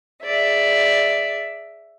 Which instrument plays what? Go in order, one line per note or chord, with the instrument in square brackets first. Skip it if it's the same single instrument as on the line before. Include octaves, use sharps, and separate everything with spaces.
[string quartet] G#4 D5 E5